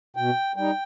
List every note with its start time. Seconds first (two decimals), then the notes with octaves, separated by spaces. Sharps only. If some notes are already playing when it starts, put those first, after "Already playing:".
0.16 B2 G5
0.56 G3 D#4 G5